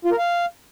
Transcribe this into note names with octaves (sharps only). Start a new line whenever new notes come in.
F4
A#4
F5